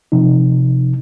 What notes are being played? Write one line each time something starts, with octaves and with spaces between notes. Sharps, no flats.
C3 F3 D#4